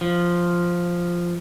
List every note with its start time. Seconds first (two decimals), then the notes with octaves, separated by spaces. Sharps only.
0.01 F3